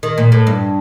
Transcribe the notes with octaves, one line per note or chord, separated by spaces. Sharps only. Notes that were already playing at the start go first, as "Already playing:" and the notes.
D#3
A#2
A2
G2